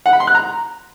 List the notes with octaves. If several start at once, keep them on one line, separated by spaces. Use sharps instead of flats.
F#5
B5
C6
F#6
A#5